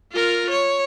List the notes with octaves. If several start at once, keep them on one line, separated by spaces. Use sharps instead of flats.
F4 A#4
C#5